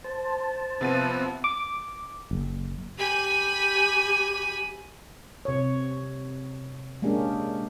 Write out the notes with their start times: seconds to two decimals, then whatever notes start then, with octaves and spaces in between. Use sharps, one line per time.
0.04 C5 A5
0.81 C3 F3 B3 A6 D#7
1.44 D6
2.31 F#1
2.99 G4 G#5 B5
5.45 C3 C#5
7.02 G#3 A#3 C#4 D4 G4